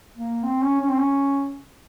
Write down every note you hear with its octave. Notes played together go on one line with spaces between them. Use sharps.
A#3
C4
C#4
C#4
C4
C#4